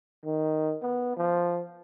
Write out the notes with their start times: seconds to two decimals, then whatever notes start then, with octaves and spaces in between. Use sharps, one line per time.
0.25 D#3
0.82 B3
1.17 F3